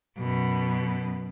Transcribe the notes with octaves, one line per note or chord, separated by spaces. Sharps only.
F#2 B2